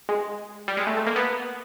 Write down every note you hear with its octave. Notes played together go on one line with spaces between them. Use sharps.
G#3
G3
G#3
A3
A3
A#3
B3